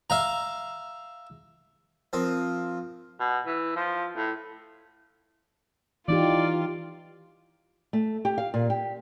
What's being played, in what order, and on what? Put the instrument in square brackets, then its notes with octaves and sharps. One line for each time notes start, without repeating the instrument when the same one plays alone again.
[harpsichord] E5 F5 A#5
F3 C4 A#4 D#6
[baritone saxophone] B2
E3
F3
A2
[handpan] E3 D#4 G4 [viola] F4 [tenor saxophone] D5
[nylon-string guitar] A3
G4
F5
A#2
G4